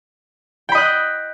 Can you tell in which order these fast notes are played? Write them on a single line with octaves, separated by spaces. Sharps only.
G5 B5 D#5 F#6